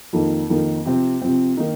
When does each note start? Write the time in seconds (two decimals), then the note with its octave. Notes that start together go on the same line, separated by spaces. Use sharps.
0.13 F2 D#3 A#3 D#4
0.50 F2 D#3 A#3 D#4
0.85 C3 F3 C4
1.22 C3 F3 C4
1.57 D#3 A#3 D#4